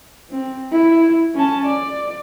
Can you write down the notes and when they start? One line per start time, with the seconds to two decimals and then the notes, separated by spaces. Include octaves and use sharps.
0.31 C4
0.72 E4
1.35 C#4 A5
1.65 D5